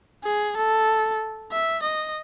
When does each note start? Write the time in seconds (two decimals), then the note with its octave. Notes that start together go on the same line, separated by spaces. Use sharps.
0.24 G#4
0.57 A4
1.52 E5
1.83 D#5